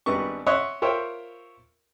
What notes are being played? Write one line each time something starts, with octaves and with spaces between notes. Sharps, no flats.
G#1 G3 B3 D4 C#6
C#5 D#5 E5 F#5 C6
F4 A#4 C5 C#5 E5 G5